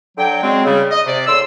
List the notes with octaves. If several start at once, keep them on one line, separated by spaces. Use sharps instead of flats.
D3 F#3 G5
C#3 F#3 G#3 C4
C#3 G3
D#5
C3 D5
E2 A2 C6 E6